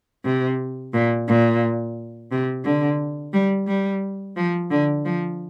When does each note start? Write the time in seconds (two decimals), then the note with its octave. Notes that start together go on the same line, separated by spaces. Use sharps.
0.25 C3
0.94 A#2
1.28 A#2
2.31 C3
2.65 D3
3.33 G3
3.67 G3
4.37 F3
4.71 D3
5.05 F3